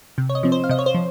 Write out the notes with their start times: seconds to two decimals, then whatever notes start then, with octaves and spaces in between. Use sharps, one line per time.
0.18 C3
0.29 C#5
0.35 D#5
0.43 F3 C4
0.52 C5
0.64 F5
0.69 C3 D#5
0.79 C#5
0.86 C5
0.94 F3